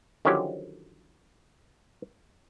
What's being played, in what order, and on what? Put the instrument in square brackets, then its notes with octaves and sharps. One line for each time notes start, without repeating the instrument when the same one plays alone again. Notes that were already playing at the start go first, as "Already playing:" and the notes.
[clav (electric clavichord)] D3 D#3 F3 F#3 C#4 G4